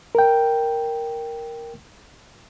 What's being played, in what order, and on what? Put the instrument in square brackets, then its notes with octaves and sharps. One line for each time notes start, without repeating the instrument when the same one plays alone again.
[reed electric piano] A#4 G5